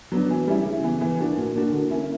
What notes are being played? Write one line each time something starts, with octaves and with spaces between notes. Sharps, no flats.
F#3 B3 D4
E3
G3 C#4 E4
C#3
E3 B3
E3
A#3 D4 F#4
A#2
A#3 D4 F#4
D3
A#3 C#4 E4